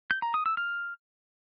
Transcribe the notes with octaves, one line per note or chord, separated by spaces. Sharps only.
G6
A#5
D#6
E6
F6